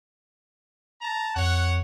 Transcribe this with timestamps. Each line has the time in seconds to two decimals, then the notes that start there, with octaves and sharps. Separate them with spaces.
1.01 A5 A#5
1.36 F2 C#5 F#5